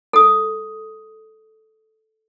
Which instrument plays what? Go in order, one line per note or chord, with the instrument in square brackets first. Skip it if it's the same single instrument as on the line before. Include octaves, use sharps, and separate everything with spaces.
[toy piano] A4 D#6